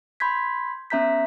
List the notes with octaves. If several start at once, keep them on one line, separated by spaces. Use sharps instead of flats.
B5 C6 G6 G#6 B6
B3 C#4 E5 A#5 G6 B6